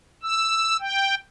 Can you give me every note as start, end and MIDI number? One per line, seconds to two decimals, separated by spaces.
0.23 0.77 88
0.80 1.15 79